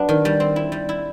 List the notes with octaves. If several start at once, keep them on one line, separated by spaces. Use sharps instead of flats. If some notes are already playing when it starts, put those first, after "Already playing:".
Already playing: F#3 B3 D4
D#3
G3
C4
E4
G3
E4